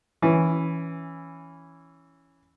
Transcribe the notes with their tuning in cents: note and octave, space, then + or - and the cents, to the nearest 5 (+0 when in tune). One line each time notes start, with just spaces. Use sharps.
E3 +0 C#4 +0